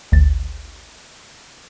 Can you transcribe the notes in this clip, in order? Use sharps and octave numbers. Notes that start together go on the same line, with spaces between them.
G#1 D2 A6